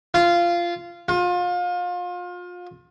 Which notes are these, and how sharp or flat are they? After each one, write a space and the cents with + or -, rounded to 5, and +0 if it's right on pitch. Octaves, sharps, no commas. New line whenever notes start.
F4 -15
F4 +30